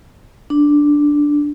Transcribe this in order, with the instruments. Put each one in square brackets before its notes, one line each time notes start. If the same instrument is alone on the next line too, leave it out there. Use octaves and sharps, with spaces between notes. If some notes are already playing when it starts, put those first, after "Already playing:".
[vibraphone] D4